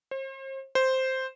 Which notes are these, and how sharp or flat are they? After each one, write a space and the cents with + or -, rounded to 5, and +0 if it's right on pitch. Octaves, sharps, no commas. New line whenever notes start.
C5 +40
C5 +0